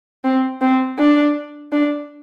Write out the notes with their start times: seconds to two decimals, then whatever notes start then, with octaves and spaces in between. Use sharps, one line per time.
0.24 C4
0.61 C4
0.99 D4
1.72 D4